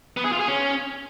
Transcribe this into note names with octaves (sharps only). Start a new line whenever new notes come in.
B3
G#4
F4
G#4
C#4